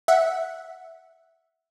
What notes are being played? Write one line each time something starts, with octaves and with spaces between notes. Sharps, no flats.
E5 F#5